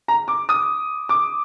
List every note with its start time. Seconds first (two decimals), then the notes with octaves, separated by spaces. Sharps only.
0.08 A#5
0.28 D6
0.49 D#6
1.09 D6